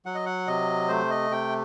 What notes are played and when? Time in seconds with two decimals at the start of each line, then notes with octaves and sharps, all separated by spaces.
0.06 F#3 F#5
0.15 D#5
0.26 F#5
0.48 C3 D#5
0.89 A3 C5
1.11 D#5
1.31 C3 G5